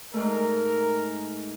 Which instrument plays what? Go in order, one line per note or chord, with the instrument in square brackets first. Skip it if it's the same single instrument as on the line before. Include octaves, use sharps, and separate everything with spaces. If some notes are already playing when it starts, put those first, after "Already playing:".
[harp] G#2 G#3 A3 [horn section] A#4